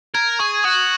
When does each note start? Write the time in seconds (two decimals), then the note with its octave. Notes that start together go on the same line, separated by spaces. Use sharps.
0.14 A#4 G#6
0.39 G#4 C#6
0.64 F#4 D#6